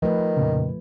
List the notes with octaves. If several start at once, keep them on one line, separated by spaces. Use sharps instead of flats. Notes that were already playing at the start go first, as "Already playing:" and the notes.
D#3 F3 A3 B4
F2 A#2 C#3